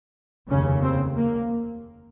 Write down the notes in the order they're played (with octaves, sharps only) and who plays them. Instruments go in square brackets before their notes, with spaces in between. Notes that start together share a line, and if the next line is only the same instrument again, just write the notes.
[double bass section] F1 D#2 C#3 C#4
C4
A#3